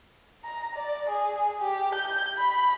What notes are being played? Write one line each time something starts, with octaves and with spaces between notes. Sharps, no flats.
A#5
D5
G#4
G4
G6
B5